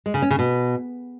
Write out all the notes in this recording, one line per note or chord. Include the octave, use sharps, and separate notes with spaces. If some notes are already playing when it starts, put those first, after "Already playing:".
G#3
C#3
C#4
C#3
B2